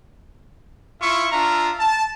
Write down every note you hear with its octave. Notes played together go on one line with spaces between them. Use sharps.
E4 F4 E5 C#6
D4 F4 E5 A#5
A5